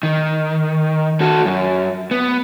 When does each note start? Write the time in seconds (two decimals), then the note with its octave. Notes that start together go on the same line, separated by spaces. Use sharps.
0.03 D#3
1.21 F#4 A4
1.45 F#2
2.11 B3